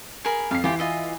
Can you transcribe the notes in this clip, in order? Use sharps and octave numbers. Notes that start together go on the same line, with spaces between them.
G#4 A#4 B5
F2 F5 C7
E3 F4 G4
F4 D#5 E5